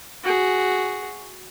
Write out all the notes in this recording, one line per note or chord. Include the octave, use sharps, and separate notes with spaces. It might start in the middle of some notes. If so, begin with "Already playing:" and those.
F#4 G#4